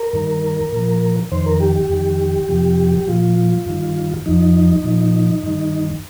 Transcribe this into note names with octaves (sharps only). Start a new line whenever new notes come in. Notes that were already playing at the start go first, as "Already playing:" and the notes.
Already playing: A#4
G2 D#3
A#2 F3
F2 D#3 C5
A#4
G4
G4
F2 D#3
F2 C3 F3
G4
A#2 F3 F4
G2 D#3
F2 F3 D#4
A#2 F3
G2 D#3